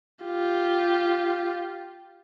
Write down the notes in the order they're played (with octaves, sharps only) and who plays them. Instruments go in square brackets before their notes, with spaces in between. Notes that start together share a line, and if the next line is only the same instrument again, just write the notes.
[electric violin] F4 G4